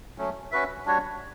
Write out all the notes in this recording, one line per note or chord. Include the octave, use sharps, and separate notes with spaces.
F#3 A3 C#4
C#4 F#4 B4 E5
G3 D4 F#4 C#5